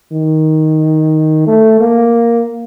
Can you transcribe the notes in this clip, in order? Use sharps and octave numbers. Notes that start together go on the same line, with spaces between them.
D#3
A3
A#3